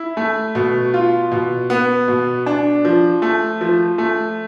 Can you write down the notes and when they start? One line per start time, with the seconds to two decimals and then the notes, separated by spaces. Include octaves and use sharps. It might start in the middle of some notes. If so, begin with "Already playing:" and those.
Already playing: E4
0.17 A3
0.55 B2
0.94 F4
1.32 B2
1.70 B3
2.08 B2
2.46 D4
2.85 F3
3.22 A3
3.61 F3
3.98 A3